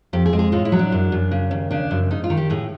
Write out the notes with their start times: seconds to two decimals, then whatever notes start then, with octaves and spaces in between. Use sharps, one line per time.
0.13 F2 G4
0.26 G#4
0.33 G#3
0.39 G#4
0.52 A2 F4
0.65 E4
0.72 F#3
0.79 D4
0.92 F#2
1.12 F#2
1.31 C#3
1.51 D#2
1.71 C#3 D4
1.91 F#2
2.11 G#2 D#4
2.24 F4
2.30 D#3
2.37 G4
2.50 A2 G#4